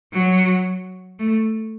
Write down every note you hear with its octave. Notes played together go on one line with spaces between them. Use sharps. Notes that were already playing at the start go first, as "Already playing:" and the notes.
F#3
A3